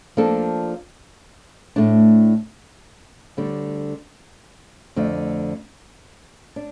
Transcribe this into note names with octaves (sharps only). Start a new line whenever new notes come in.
F3 A#3 D4 A4
A2 A3 D4
D2 D3 G3
F2 D3 A3
D4